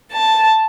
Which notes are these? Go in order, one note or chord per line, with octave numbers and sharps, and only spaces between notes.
A5